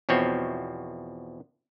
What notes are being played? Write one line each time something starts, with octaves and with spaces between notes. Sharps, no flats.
E2 B2 F3 C4 C#5